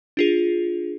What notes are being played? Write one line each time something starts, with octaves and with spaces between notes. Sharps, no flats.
D4 F4 G#4